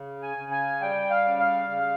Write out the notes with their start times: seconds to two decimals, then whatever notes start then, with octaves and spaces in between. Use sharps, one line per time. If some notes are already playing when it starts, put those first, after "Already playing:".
Already playing: C#3
0.23 G#5
0.37 C#3
0.51 G#5
0.81 G3 G5
1.10 F5
1.24 C#3
1.39 F5
1.69 C#3